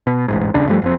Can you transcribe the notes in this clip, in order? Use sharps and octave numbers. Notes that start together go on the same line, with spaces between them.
B2
E1 A1 G#2
D#1 C#2 C#3 D4
G2 F3 G3 A3
F#1 F2 C4